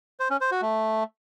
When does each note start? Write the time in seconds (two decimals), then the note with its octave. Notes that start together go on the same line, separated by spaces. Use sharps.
0.20 C5
0.30 C#4
0.41 C5
0.51 F#4
0.62 A3